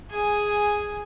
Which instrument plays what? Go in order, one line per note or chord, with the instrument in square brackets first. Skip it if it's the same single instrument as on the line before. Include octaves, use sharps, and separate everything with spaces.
[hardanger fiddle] G#4 G#5